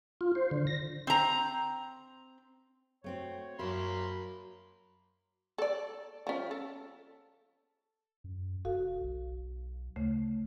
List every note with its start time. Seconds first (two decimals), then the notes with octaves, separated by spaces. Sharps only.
0.21 F4
0.35 C5
0.51 D3
0.67 A#6
1.07 C4 A#5
3.04 A3 C4 F#4 C#5
3.59 F#2 A#3 F#4 E5 B5 C6
5.58 A4 D5
6.27 F3 C#4
6.51 A4
8.24 F#2
8.65 F1 F#4 A4 F5
9.01 B1
9.96 D2 C#3 A3